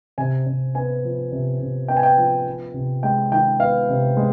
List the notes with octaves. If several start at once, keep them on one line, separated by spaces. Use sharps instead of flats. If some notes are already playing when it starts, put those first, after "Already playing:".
C3 G#5
C3
B3 G#5
F3
C3
C3
B3 G5
G#5
G5
F3
B3
C3
G#3 G5
D#3 G5
B3 F5
C3
G#3